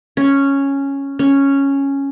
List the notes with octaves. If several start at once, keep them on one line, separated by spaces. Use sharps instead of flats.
C#4
C#4